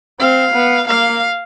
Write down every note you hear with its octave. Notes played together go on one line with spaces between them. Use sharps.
C4 F5
B3
A#3 F5